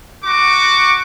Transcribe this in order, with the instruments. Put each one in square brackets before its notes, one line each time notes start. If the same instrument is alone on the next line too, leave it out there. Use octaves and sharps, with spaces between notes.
[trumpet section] F#4 C#6 D6